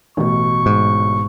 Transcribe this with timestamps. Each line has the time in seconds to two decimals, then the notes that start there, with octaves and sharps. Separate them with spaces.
0.17 A1 B2 C#6
0.66 G#2